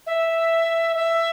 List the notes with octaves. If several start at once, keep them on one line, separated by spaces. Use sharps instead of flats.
E5
E5